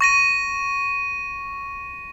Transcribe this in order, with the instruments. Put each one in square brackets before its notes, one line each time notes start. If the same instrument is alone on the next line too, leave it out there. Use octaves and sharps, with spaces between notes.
[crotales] C#6 A#6 D#7